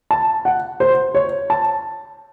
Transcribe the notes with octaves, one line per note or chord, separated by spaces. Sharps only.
A5
F#5
C5
C#5
A5